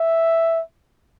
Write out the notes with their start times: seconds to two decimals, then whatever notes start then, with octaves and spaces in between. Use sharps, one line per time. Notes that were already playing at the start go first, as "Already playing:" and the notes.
Already playing: E5